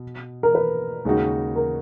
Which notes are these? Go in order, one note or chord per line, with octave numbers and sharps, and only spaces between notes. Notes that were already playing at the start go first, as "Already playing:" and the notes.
Already playing: B2
A#4
B4
D#2 C#3 G#3 D#4 F#4
A#4